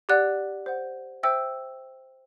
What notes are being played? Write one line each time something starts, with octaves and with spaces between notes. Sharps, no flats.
G4 D5 F#5 F#6
C5 F#5
C5 E5 G5 E6